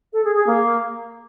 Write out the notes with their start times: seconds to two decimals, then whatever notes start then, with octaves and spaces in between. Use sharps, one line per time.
0.13 A4
0.24 G#4
0.35 G#4
0.47 A#3